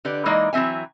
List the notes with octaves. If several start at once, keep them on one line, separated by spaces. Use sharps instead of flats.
D3 G4 B4 D5
E3 G#3 A#3 D#4 D5
E3 F#3 C4 E5 G#5